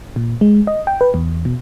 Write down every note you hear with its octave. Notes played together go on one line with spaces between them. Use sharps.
A#2
G#3
D#5
G5
B4
E2
B2